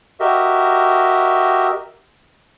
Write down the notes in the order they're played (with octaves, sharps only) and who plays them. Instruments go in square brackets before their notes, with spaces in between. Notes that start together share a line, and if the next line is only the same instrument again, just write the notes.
[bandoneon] F#4 G4 A#4 D#5 E5